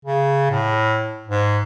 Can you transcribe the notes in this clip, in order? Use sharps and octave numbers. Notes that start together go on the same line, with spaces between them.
C#3
A2
G#2